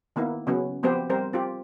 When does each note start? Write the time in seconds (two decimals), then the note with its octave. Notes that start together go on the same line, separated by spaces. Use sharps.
0.16 D#3 A#3 B3 E4
0.47 C#3 F#3 B3 C#4
0.83 F3 B3 C4 G4 C5
1.10 G3 C4 A#4 C5
1.33 C4 F4 G4